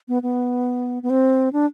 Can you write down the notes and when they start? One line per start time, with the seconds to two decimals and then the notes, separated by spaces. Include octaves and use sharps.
0.08 B3
0.23 B3
1.03 B3
1.10 C4
1.53 D4